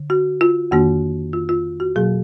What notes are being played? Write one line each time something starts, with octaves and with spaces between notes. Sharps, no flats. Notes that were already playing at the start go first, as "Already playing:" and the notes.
Already playing: D3
F#4
F4
F2 D#3 A#3 D4 F#4
F4
F4
F#4
B2 F#3 A#3 G#4